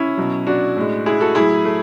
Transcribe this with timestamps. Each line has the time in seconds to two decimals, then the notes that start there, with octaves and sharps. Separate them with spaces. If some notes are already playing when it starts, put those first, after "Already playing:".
Already playing: C#4 E4
0.17 B2 F#3
0.47 D4 F#4
0.77 A2 G#3
1.06 E4 G#4
1.20 F#4 A4
1.35 A2 F#3 E4 G#4
1.65 A3